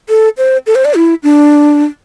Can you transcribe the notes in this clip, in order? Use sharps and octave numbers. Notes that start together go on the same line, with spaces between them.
A4
C5
A4
C5
D5
E4
D4